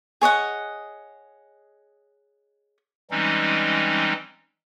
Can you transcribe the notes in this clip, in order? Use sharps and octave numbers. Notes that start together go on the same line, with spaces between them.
G#4 C#5 D#5 F#5
E3 G3 G#3 C4 C#4 D#4